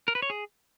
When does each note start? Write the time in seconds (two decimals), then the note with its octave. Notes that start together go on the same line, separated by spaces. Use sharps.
0.08 A#4
0.15 B4
0.22 C#5
0.30 G#4